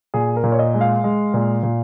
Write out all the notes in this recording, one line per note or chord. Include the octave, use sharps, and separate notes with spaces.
A#2 G#4
A#4
A#2
C#5
D#5
G#3
F5
G#3
A#2
A#2